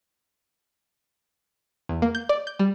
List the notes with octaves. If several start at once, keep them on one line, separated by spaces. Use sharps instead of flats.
E2
A#3
G6
D5
G6
G3